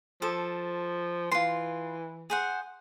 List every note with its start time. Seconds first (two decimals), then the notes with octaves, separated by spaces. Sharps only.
0.22 F3 A4
1.32 E3 F4 C6
2.30 G#4 C5 F#5